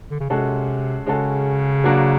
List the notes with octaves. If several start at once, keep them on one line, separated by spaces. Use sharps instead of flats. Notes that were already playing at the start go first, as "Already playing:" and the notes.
D3
C#3
C3 G#3 C#4 F#4 A4
C#3 G#3 C#4 F#4 A4
F#3 A#3 D4 F#4